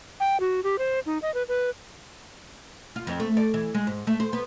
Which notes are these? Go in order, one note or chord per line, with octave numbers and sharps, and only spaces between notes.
G5
F#4
G4
C5
D#4
D#5
B4
B4
F4
F2
A3
D5
E3
G#3
G#2
A3
C5
B3